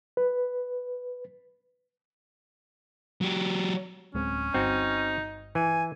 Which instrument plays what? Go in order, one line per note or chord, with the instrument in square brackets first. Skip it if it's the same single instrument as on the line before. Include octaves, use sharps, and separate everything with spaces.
[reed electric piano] B4
[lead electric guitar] F#3 G4
[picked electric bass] D1 G#3 C4 [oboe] C#4
[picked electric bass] G1 [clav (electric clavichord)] C4 F#4 [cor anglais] D#4
[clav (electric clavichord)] E3 [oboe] G#5